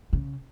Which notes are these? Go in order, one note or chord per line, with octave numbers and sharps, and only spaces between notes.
C#3